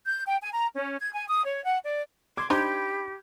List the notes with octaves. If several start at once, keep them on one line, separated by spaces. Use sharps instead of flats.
G6
G5
G#5
A#5
C#4
G#6
G#5
D#6
C#5
F#5
D5
C6 D6 G#6
D4 D#4 G4 C5 B5 G6